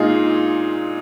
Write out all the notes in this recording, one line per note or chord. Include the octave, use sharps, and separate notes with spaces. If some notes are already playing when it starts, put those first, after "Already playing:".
Already playing: A#2 G#3 D#4 F4 G#4